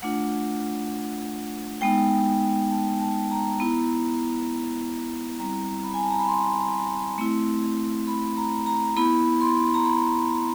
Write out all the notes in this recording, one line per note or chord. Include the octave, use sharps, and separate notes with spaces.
A3 D4 F4 F#5
G#3 B3 D#4 G5
A5
A5
A#5
B3 E4
G3 C4 E4 A#5
B5
G#5
A5
A#5
B5
C6
A3 C4 E4
B5
A#5
A#5
B3 E4 B5
C6
A#5
B5
B5